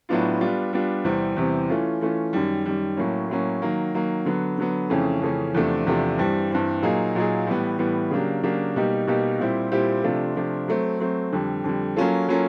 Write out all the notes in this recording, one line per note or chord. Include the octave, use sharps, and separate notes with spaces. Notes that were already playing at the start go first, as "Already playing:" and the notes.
A2 F#3 B3 D4 F4
G3 B3 D4 F4
G3 B3 D4 F4
E2 C3 E3 G3 C4
E2 C3 E3 G3 C4
E3 A3 C#4 F4
E3 A3 C#4 F4
F#2 D#3 G3
F#2 D#3 G3
A2 F#3 A#3 C#4
A2 F#3 A#3 C#4
D#3 F#3 A#3
D#3 F#3 A#3
D3 F#3 B3
D3 F#3 B3
F2 C#3 E3 A3 C#4
F2 C#3 E3 A3 C#4
E2 C3 F3 A3 D4
E2 C3 F3 A3 D4
G2 E3 G3 C4
G2 E3 G3 C4
A#2 F#3 A#3 D#4 G#4
A#2 F#3 A#3 D#4 G#4
A2 E3 G3 B3
A2 E3 G3 B3
C#3 F#3 A#3 D4 G4
C#3 F#3 A#3 D4 G4
B2 G3 A#3 D#4 G4
B2 G3 A#3 D#4 G4
A#2 G3 C4 E4 G4
A#2 G3 C4 E4 G4
C3 F3 A3 D4 F4
C3 F3 A3 D4 F4
F#3 A3 C4
F#3 A3 C4
F2 D3 G3
F2 D3 G3
F#3 A#3 C#4 F4 A4
F#3 A#3 C#4 F4 A4